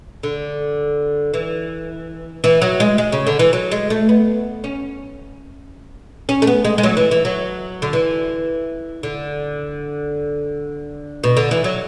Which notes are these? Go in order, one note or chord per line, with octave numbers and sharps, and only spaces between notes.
D3
E3
E3
F#3
G#3
G#3
C#3
D3
E3
F#3
G#3
A3
B3
C#4
C#4
A3
B3
G#3
G#3
F#3
E3
E3
F#3
D3
E3
D3
B2
D3
E3
F#3